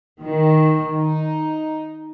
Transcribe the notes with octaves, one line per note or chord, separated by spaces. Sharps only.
D#3
D#4